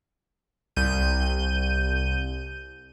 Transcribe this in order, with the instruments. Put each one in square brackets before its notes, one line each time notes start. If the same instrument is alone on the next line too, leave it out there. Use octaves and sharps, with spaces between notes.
[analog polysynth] C2 G6 D#7